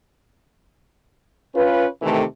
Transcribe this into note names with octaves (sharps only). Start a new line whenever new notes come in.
C#4 F4 B4
C3 D#3 E3 A3